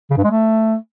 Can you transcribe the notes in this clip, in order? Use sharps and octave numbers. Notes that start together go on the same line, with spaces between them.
C#3
G2
G#3
A3